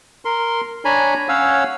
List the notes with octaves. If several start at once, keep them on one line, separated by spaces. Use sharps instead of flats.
A#4 C6
D4 C#5 G#5 A#5 B5
C#4 C#5 F5 F#5 E6